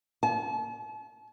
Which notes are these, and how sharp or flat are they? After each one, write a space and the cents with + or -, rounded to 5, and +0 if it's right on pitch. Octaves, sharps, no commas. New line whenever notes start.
A5 -40